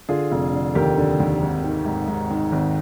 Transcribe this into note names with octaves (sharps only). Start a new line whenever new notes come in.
D3 F4 G#4
F1
D3
D#2 G4 A#4
D3
D#2
G#1
D#3
G#2
G#2
D#3
G#1